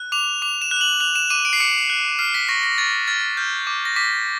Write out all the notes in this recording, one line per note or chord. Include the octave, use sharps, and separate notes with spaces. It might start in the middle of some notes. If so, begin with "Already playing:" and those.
Already playing: F#6
D6 F7
D6 F7
E7
F#6
F7
F#7
F#6 F7
E7
D6 D#7
D7
C7
D6 C#7
F#6
F6 C7
B6
C#6 A#6
A#6
C#6 A6
F6 A6
F6 G6
D6
A#6
D6 B6